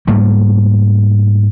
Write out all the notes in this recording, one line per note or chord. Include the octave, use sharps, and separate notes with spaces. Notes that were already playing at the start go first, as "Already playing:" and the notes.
G#2 G3 A3 A#3